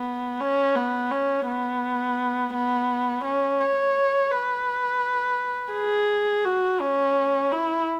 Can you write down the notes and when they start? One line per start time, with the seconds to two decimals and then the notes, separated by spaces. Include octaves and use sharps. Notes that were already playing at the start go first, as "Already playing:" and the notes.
Already playing: B3
0.40 C#4
0.75 B3
1.11 C#4
1.47 B3
2.54 B3
3.24 C#4
3.60 C#5
4.31 B4
5.73 G#4
6.45 F#4
6.81 C#4
7.52 E4